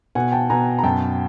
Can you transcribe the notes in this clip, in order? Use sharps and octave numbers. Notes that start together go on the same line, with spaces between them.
B2 F#5 G#5
G5 A5
B2 G#5 A#5
A#5
F#2 G5 A5